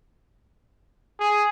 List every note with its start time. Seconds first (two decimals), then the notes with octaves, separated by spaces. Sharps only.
1.19 G#4